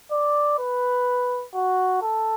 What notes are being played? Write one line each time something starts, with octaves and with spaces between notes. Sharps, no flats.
D5
B4
F#4
A4